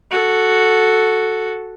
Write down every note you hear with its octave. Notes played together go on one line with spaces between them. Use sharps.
F#4 A4